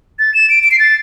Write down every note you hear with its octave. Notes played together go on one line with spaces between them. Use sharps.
A6
E7
D7
D7
C7
A6